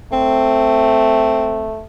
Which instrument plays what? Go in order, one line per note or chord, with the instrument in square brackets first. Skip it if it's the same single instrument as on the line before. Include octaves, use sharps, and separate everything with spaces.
[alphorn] A3 [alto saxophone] C4